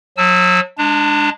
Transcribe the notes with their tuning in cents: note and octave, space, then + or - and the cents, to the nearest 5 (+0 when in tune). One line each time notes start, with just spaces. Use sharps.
F#3 -40 A5 -30 E6 +0
G#3 -15 D4 +0 A5 +40